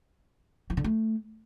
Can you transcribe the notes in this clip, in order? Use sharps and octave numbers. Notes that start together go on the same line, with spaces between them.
E3
D3
A3